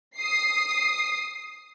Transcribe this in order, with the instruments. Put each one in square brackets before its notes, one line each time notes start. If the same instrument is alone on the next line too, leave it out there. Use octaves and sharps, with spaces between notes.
[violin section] D#6 C7